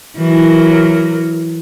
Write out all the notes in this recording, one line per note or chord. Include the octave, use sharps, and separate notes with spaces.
E3 F#3 A#4